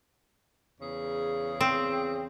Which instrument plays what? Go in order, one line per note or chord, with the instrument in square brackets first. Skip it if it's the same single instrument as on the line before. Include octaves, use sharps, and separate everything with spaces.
[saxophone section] E2 C#3 G#4
[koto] C4